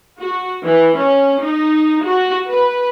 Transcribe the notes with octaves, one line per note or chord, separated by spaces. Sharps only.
F#4
E3
C#4
D#4
F#4
B4